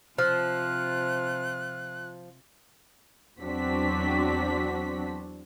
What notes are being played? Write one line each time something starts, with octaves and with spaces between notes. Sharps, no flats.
C3 F3 F4 F6 F#6
E2 F#3 C4 D4 F#4 B6